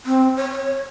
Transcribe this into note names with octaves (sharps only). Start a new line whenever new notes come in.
C4
C#5